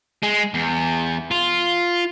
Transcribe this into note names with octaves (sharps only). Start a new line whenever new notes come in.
G#3
E2
F4